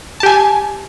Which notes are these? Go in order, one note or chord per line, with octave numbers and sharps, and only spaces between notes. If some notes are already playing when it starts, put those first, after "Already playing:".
G4 G#5 A5